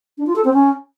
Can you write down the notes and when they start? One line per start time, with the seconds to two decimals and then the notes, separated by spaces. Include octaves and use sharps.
0.18 D4
0.27 F4
0.36 A4
0.45 C4
0.53 C#4